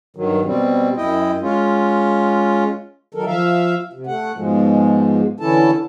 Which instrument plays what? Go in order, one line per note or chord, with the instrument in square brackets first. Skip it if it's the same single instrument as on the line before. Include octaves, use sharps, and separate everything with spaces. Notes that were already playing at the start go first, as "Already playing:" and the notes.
[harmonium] G2 D#3 F#3
B2 G3 C4
F#2 E4 D#5 G5
G#3 C#4 F4
D#3 F#3 A4 A#4
F3 E5 F5
C3
A3 F#5
G#2 B2 F3 G#3
D3 E3 C#4 E4 A4 A5